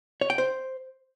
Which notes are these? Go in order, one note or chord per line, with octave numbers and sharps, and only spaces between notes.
C#5
G5
C5